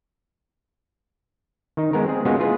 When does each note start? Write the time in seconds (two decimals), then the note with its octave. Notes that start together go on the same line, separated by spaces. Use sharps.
1.77 D#3 D#4
1.93 G#3 B3 A#4
2.06 C4 G#4
2.25 G#3 A#3 B3 C#4 F4 F#4
2.39 E4 F4 G#4 B4